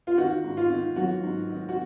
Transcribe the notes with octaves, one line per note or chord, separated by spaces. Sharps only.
F4
D#3 F#4
G#2
F4
D#3
F#3 F#4
G#2
D#3
F#4